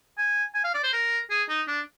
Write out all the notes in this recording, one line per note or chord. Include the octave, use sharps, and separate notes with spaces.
G#5
G#5
F5
D5
C5
A#4
G#4
D#4
D4